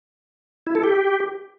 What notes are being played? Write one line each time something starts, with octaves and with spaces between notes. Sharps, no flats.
E4
A4
G4